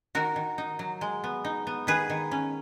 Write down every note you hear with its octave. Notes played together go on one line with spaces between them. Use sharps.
D#3 F#4 A#4
D#3
D#4
F#3
G#3
B3
D#4
B3
D#3 G#4 B4
D#3
C#4